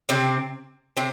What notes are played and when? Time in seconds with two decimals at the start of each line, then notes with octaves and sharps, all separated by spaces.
0.09 C3 C4
0.97 C3 C4